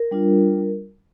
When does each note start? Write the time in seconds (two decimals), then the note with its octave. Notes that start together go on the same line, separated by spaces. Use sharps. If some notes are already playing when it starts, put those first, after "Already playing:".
Already playing: A#4
0.11 G3 D4 F4